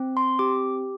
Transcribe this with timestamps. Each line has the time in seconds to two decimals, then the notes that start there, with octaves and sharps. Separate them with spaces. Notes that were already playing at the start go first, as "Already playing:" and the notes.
Already playing: C4
0.17 C6
0.39 G4 D6